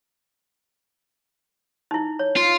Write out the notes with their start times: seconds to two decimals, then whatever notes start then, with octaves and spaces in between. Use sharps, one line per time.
1.91 D#4 E4
2.19 C#5
2.37 F4